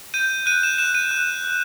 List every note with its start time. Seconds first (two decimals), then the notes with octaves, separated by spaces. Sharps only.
0.14 G6 D#7
0.46 F#6 D#7
0.63 E7
0.78 F#6 E7
0.95 D#7
1.11 F#6
1.44 F#6